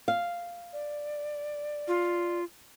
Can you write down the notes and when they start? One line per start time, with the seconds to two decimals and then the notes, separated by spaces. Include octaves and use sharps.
0.08 F5
0.73 D5
1.88 F4